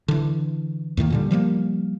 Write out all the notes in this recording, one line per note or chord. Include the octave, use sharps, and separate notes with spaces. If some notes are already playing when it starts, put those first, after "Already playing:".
D3 E3
D#2 A2 D#3 A#3
A#2 D3 G3
F3 G3 G#3 A#3